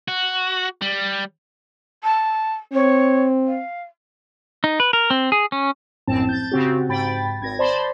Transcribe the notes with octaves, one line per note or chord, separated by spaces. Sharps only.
F#4
G3
A5
C4 C#5
F5
D#4
B4
A#4
C4
G#4
C#4
A#1 F#2 A2 C4 A5
G6 A6
C#3 C4 F#4 G4
G#2 G5 B5 A6
G#1 G#6 A#6
C5 D5 A5 B5 C6